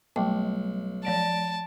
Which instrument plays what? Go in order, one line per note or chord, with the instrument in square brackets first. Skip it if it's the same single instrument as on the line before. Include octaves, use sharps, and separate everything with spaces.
[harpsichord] B1 [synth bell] G3 [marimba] A3 G5 D6
[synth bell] F3 D5 D7 [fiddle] A5